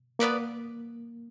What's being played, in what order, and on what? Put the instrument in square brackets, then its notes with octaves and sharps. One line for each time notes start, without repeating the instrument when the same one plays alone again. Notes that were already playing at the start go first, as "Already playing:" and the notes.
[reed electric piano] A#3 [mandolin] B3 F4 B4 D5